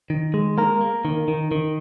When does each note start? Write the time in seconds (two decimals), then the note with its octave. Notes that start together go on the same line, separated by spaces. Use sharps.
0.10 D#3
0.34 G#3
0.58 A#3 A#4
0.81 A#3
1.05 D#3
1.28 D#3
1.52 D#3